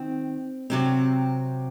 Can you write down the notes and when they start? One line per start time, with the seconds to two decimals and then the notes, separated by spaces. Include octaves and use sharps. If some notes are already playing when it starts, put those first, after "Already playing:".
Already playing: D#3 C4
0.70 C3 F#3 C4